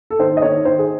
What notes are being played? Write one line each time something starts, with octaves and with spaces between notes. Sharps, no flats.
A4
D#3 C5
D#5
D#3 C#5
D#3 C5
G#4